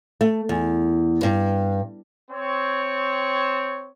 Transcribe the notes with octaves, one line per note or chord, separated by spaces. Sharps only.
A3
E2
G2
C4 C#5